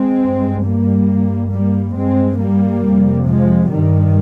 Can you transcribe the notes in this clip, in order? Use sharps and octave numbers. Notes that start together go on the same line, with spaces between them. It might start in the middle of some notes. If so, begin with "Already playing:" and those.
Already playing: G#3 C4
G2
G3 A#3
G2
G3 A#3
G2 G#3 C4
G3 A#3
F2 C3
F3 G#3
G2 D#3 G3